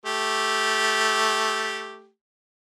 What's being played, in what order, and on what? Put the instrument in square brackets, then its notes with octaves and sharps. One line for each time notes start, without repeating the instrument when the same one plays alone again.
[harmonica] A3 G4